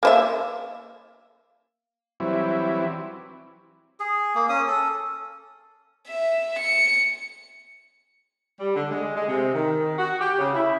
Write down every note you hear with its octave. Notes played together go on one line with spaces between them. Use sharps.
A#3 C5 E5
E3 F#3 G3 C4 E4
G#4
A#3
C#4 D#6
A4
E5
C#7
G3
D3
G#3
G#3
C3
D#3
F#4
G4
C#3
E4